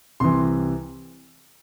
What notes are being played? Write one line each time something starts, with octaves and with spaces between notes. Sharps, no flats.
C2 C3 E3 C6